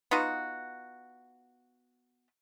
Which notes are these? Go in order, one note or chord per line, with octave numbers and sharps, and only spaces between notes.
B3 D#4 F4 F#4